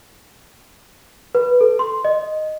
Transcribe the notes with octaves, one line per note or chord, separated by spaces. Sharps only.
B4
A4
C6
D#5